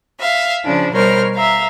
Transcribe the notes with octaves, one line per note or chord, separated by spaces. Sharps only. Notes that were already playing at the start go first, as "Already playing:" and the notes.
E5 F5
C#3 F3 D4
B2 G3 A#4 C5 C#5 F6
E5 F5 A#5